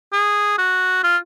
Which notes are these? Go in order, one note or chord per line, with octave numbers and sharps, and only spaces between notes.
G#4
F#4
F4